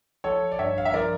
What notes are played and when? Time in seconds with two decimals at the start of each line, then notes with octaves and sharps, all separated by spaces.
0.24 F3 A4 C#5
0.52 D5
0.59 G2 C#5 E5
0.78 F5
0.85 E5
0.94 F3 A#4 D5